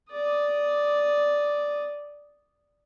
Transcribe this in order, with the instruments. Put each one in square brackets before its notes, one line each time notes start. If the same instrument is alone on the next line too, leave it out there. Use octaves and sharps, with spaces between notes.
[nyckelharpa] D5 D#6